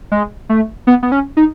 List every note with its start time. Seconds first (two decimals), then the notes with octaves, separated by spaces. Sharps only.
0.12 G#3
0.49 A3
0.87 B3
1.03 B3
1.12 C#4
1.37 D#4